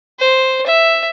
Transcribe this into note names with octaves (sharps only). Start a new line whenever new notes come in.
C5
E5